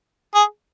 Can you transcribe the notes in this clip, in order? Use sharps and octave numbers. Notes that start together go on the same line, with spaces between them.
G#4